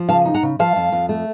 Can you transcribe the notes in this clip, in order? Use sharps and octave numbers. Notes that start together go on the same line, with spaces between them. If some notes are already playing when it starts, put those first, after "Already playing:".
Already playing: F3
C#3 F5 A5
D#4
F#5 A#5
C#3
F3 F5 A5
F2
F2
A3